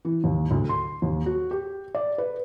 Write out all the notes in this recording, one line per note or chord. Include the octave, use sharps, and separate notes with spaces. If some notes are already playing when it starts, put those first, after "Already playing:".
E3
D#2
D2
C6
D#2
F#4
G4
D5
B4